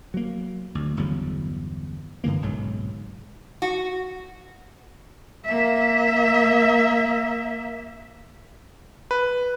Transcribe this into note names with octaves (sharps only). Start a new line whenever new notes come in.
F#3 A#3
D2
G1 E2 C#3 F#3
G2 D3 E3 A#3
F#1 B1 G#2 F#3
F#4
A#3 E5
B4